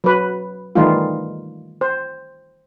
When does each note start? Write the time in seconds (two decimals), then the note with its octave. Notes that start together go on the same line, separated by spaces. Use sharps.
0.04 F#3 B4
0.75 D#3 E3 G3 A3 D#4 F4
1.81 C5